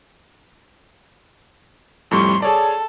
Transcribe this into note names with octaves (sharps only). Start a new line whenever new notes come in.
F2 A2 G3 C6 C#6
G#4 A4 C#5 D5 A5